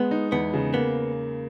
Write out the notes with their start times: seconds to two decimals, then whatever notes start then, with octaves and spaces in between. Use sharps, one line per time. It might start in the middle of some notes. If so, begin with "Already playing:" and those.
Already playing: G#3 B3
0.11 D#4
0.32 E2 B3
0.54 C#3
0.74 A#3 B3